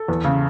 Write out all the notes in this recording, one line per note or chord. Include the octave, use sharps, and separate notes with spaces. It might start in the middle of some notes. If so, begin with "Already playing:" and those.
Already playing: A4
E2
C#3